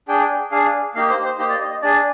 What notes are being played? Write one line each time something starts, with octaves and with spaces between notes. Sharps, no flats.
D4 G#4 G5
D4 G#4 F5
A#3 D#4 G4 F5
C5
C5
A#3 D#4 G4 C5
D5
D#5
D#5
D4 G#4 D5